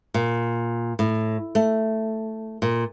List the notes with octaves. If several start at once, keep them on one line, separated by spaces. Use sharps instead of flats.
A#2
A2
A3
A#2